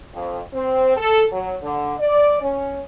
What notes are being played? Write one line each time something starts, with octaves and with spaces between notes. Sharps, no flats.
F2
C4
A4
F#3
D3
D5
C#4